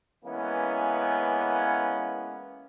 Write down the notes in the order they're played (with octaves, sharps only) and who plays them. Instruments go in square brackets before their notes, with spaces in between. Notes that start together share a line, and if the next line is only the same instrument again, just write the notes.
[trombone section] E3 G#3 A#3 B3 C#4